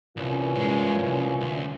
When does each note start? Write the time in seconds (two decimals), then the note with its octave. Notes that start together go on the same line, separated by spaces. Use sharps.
0.17 C2 A#2 E3 C#4
0.57 G2 G#3
0.98 C2 F#2
1.41 D2